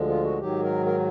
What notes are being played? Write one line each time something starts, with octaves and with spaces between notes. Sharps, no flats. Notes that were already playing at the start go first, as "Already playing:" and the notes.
Already playing: D2 D3 F3 G#3
F4
F#4
G#2 D#3 F#3 G4
A#4
A#4